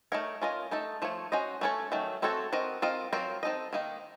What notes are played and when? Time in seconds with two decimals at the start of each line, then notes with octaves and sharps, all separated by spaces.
0.12 A3 D#4 A#4 C#5
0.42 C#4 F4 A#4 D#5
0.71 A3 D#4 A4
1.02 F3 A3 C#5
1.32 C#4 F#4 C5 D#5
1.61 A3 C#4 A4 C#5
1.92 D#3 F#3 A3
2.22 A3 C4 F#4 A4 C#5
2.53 C4 F#4 A#4 D#5
2.82 C4 F4 A#4 D#5
3.13 F#3 C4 F4 A#4
3.43 C4 D#4 A4 D#5
3.73 D#3 A#3 D#4